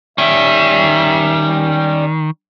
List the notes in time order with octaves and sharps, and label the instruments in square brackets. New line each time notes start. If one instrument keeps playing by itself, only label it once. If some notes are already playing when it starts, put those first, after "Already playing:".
[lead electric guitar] D#3 [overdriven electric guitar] G3 C#4 [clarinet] E5